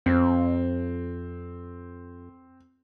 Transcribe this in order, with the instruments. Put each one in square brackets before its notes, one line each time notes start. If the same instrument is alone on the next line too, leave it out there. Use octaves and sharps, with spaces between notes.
[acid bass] F2 [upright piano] C4